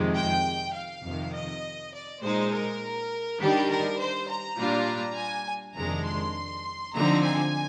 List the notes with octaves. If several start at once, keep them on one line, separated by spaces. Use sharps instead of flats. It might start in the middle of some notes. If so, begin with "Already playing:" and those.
Already playing: F2 C3 D#3 G#3
G5
F5
F2 C3 D#3
D#5
D5
A#2 G#3 D#4 C5
A#4
D#3 G3 D4 G4
A#4
C5
A#5
A#2 G3 D4 F4
G#5
F2 C3 D#3 G#3 D4 A#5
C6
D3 F3 C4 D#4 A#5
G#5